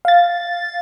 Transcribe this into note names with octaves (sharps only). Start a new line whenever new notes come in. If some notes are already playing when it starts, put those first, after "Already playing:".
F5 A6